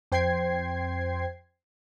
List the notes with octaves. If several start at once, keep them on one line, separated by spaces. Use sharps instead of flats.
F2 C5 G5 G#6 C7